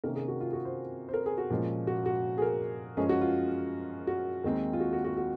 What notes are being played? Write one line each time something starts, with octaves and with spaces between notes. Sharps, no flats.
C3 D#3 A#3 C#4 A#4
G#4
F#4
F4
F#4
C5
C5
A#4
G#4
F#4
A#2 F3 G#3 C#4
F#4
F#4
G#4
A#4
F#2 F3 G#3 C#4 G#4
F#4
F4
F#4
D#2 D#3 G#3 C4
F4
F#4
F#4
F#4
F#4